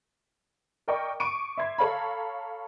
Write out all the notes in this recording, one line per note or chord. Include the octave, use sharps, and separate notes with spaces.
A#4 D5 D#5 G5 C#6 D6
C#6 D6 D7 D#7
E5 C6 G#6
A4 C#5 F5 A#5 B5